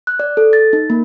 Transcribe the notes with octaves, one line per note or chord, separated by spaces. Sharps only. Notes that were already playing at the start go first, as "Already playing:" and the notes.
F#6
D5
A4
A6
D#4
A#3